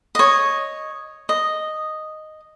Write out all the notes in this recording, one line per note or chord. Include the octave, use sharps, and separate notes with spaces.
C#5 D#5
D#5